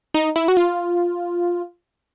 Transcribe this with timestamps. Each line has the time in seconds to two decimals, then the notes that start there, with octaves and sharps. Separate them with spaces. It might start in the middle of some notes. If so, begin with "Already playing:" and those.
0.14 D#4
0.36 E4
0.48 F#4
0.57 F4